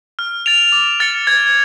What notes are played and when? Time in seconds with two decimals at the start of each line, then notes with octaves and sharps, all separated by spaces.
0.19 F6
0.46 A6 D7 F7
0.72 D6
1.00 F6 A6 C#7
1.27 G#6